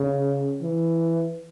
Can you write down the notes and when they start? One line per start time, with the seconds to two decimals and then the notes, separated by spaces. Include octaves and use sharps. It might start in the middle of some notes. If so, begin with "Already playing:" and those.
Already playing: C#3
0.62 E3